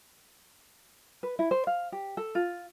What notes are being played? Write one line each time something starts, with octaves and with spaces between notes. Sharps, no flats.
B4
E4
C5
F5
G4
A4
F4